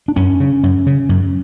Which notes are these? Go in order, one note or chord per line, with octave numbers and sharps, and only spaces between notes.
D4
F#2 C#4
C#3
F#2
C#3
F#2